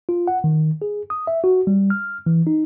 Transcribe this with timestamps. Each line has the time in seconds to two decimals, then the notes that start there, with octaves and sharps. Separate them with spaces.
0.09 F4
0.28 F#5
0.44 D#3
0.82 G#4
1.10 D#6
1.27 E5
1.44 F#4
1.67 G3
1.90 F6
2.26 E3
2.47 D#4